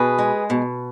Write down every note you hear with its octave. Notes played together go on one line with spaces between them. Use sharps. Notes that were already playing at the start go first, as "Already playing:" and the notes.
Already playing: B2 G#4 B4
G#3
B2